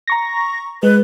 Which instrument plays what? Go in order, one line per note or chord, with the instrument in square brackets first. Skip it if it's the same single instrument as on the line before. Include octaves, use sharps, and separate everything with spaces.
[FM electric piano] A#5 C#6 A#6
[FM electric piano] G#3 [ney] B4